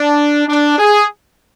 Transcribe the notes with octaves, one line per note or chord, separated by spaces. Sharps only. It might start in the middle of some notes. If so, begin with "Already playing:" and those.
Already playing: D4
D4
G#4